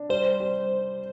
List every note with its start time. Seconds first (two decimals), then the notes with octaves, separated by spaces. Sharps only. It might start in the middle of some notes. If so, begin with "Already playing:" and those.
Already playing: D4
0.09 G3 C5
0.40 G3